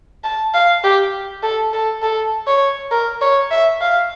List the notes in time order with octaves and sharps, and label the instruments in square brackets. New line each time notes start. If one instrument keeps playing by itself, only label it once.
[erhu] A5
F5
G4
A4
A4
A4
C#5
A#4
C#5
E5
F5